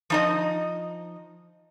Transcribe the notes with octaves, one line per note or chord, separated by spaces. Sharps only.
F3 D#4 D#5